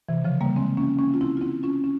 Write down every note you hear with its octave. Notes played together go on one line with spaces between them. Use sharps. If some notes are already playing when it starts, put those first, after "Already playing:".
C3 E3
C#3 F3
G3 A#3
G#3 C4
A#3 C#4
A#3 C#4
F4
C4 E4
F4
C4 E4
C#4 F4
C#4